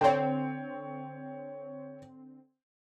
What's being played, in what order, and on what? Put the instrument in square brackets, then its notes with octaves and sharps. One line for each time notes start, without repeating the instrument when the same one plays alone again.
[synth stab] D3 C4 [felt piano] C#5 G5